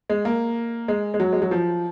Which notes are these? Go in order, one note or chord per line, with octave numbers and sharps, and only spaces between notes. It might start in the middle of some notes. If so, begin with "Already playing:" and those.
G#3
A#3
G#3
G#3
F#3
G#3
F#3
F3